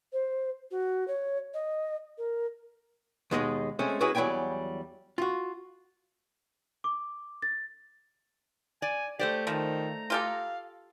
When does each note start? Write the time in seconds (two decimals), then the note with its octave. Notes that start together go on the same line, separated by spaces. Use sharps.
0.13 C5
0.71 F#4
1.08 C#5
1.54 D#5
2.18 A#4
3.31 D#2 B2 G#3 D#4 A#4 D#5
3.79 G#3 A3 C4 C#4
4.00 C#4 E4 F#4 G#4 B4 D#5
4.15 E2 F#3 G3 E4 G5 G#5
5.18 F4 F#4
6.84 D6
7.42 A6
8.82 D5 G#5
9.19 A3 G4 C5 D5
9.47 D#3 F3 A#5
10.10 F4 G4 A4 F5